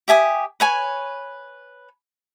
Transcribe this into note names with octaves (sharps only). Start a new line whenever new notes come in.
G4 E5 G#5 D#6
B4 C#5 G#5